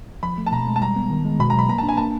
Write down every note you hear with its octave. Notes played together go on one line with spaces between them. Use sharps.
F3 B5
A3
A5
B2 A#5
G#3
A5
G3 A#5
B3
D#3
G#3
B2 B5
A#5
F#3 B5
A#3 A#5
A5
D4
G#5
A#3 A5